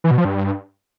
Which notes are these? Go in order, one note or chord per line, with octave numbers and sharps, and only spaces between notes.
E3
B2
F3
G2